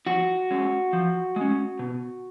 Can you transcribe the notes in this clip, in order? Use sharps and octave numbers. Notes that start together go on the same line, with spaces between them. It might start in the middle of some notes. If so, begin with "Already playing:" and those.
F3 F#4
G#3 C#4
F3
G#3 C#4
B2